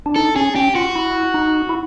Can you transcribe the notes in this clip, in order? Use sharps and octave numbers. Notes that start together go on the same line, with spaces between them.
D4
D#4 A4
C#4 G#4
C#4 G4
F4 F#4
E4
D#4
E4